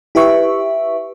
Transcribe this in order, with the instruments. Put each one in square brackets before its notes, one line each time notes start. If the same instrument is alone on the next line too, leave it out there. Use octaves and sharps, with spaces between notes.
[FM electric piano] E4 G4 B4 E5 C#6